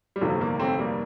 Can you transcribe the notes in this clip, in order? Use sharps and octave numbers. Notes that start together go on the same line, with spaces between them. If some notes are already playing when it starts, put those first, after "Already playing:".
G3
G1 F2 C3 D#3 A3
A3
G3 A#3
A3 C4
G3 A#3